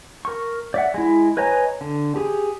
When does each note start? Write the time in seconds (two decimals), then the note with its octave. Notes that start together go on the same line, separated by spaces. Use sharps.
0.25 A#4 C#6
0.74 D5 E5 F#5
0.94 G#3 E4
1.37 B4 C#5 D#5 G#5 A#5
1.81 D3
2.16 G4 G#4